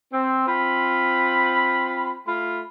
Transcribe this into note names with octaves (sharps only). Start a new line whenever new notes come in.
C4
C4 F4 B5
A3 F4 B5